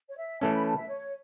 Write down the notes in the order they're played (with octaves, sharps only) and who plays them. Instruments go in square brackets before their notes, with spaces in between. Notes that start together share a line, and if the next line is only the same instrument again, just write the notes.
[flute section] C#5
E5
[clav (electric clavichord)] E3 A3 C#4 [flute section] A5
[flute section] B5
A5
E5
C#5